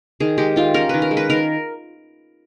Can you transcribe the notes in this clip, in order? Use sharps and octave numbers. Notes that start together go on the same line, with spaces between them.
D#3 G#4
G#3 G4
D#3 F4
C#4 A#4
D#3 B4
A#4
G#3
B4
D#3 A#4